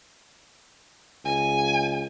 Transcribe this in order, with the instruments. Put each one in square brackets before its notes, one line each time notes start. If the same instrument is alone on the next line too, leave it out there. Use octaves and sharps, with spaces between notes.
[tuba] C#2 [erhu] G#5